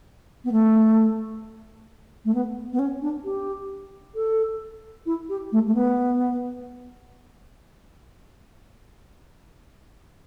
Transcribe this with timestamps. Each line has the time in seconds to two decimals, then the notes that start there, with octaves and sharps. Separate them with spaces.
0.44 B3
0.51 A3
2.25 A3
2.34 B3
2.72 B3
2.79 C#4
3.01 D4
3.24 G4
4.15 A4
5.06 E4
5.29 G4
5.52 A3
5.66 A3
5.74 B3